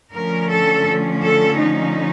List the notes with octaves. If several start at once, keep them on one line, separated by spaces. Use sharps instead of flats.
D3 F3 A3 C#4 A#4
A4
A4
D#4